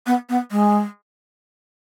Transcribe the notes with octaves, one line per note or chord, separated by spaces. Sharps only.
B3
B3
G#3